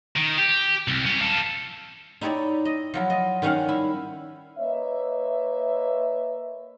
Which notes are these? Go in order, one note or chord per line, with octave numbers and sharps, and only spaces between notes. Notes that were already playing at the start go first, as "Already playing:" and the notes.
D#3
G4
C2
C#4 G4
A4 F5
D#4 E4 G4 C#5 D5
D#5
F3 F#3 E4
D#5
D#3 G3 C#4 F5 F#5
E4
A#3 B4 C#5 D#5 E5